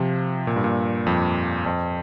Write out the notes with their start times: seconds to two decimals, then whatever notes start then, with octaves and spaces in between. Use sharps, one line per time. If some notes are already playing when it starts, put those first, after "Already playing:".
Already playing: C3 F3
0.47 A#2
0.56 G2
0.64 A#2
1.06 F2
1.66 F2